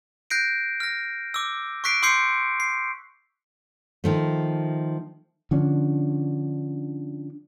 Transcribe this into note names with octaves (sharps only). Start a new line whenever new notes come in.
F#6 G6 A#6 C7 D7
F6 A#6
D6 E6
C#6 D6 F#6 B6 C7 D7
C6 D6 E6 G6 C7 C#7
C7
D#3 F3 A3
D3 F3 C#4 D4